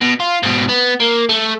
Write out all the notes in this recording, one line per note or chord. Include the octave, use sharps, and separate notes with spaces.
B2
F4
G#2 B2
B3
A#3
A3